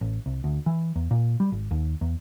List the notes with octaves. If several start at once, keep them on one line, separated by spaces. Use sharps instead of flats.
A1
C2
D2
E3
E2
A#2
G3
G#1
D#2
E2